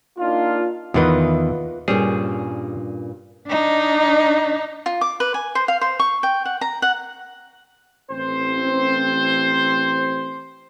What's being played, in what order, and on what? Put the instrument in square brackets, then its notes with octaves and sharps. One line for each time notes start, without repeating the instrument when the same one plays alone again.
[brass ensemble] A#3 D4 D#4 F4
[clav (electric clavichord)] E2 D#3 E3 [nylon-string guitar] F4 B4 D#5
[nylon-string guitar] G2 A#2 C#4 [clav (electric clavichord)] G3 G#4
[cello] D4 D#4
[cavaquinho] F4
D6
B4
G#5
C5
F5
C5
C#6
G5
F#5
A#5
F#5
[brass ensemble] A1 C4 C5